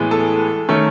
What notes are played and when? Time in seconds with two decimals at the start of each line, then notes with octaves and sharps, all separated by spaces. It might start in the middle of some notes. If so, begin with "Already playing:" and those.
Already playing: A2 E3 G#3 B3
0.11 A4
0.69 D#3 A3 C#4